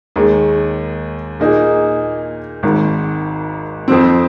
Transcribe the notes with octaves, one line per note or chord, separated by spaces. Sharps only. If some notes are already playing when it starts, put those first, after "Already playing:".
D#2 D#3 G#3
A#2 A#3 D#4 G#4
G#1 G#2 D#3
F2 F3 C4